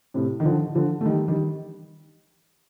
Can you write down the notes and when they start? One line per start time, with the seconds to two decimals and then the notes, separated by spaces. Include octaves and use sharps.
0.14 A2 C3
0.40 D#3
0.45 D3 F3
0.75 D3 F3
1.01 A3
1.05 D#3 G3
1.28 D#3 G3